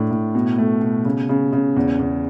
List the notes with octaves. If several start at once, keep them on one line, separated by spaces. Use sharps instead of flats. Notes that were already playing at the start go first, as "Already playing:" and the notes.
Already playing: A2 D4
A2
B2
A3
B2
C#3
C#3
C#3
E2
E2